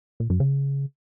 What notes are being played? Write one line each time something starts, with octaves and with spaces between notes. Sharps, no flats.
A#2
F#2
C#3